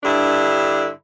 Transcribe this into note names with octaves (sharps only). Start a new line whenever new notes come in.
G2 D3 D4 E4